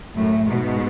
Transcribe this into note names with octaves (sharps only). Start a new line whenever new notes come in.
F#2 A2
G#2 B2